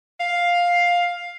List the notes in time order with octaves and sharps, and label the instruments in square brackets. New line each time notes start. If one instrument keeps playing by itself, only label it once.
[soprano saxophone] F5